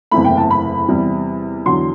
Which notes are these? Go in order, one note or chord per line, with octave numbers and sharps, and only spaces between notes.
F#1 E2 C3 E3 A3 B5
G5
A5
B5
E2 C3 G3
E2 D3 F#3 C6